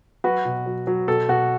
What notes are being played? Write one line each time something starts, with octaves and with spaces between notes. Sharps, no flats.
F#3 F#4 B4
B2
F#3
F#3
B2 A4
B2 F#4